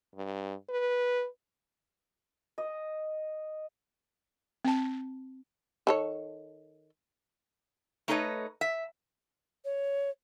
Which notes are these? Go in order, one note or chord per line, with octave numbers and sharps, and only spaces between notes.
G2
B4
D#5
C4 A5
D#3 A4 C#5
A3 D#4 A4 B4 C#5 D#5
E5
C#5